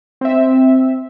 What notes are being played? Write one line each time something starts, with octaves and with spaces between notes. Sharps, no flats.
C4 E5